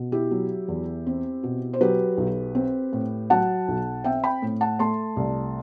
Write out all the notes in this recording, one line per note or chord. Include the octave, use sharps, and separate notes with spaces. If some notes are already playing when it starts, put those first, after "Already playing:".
Already playing: B2
E4 G4
F#3
E2
C4
B2
C5
F#3 G4 B4
B1
C4
A2
F#3 F#5 A5
B1
C4 E5 G5
G5 B5
A2
F#5 A5
A3 A5 C6
C2